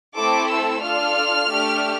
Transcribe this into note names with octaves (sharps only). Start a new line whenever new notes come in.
A3 C4 E4 A4 D6
E6
D4 F4 A4 F6
A3 D4 G4